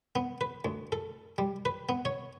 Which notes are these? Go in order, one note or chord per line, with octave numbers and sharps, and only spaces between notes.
B3
B4
D2
A4
G3
B4
B3
C#5